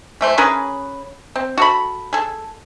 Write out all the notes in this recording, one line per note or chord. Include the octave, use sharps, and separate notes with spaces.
E3 A3 C5
C#4 G#4 A#4 B4
C4
F#4 A4 B5
G#4 A4